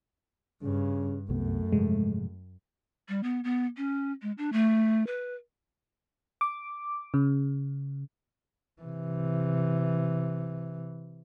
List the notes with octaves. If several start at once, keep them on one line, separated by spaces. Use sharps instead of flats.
G2 C#3
C2 F#2 C3 A3 B3
G#2 C3 F3 G#3
G3
B3
B3
C#4
G#3
D4
A3
B4
D6
C#3
C3 E3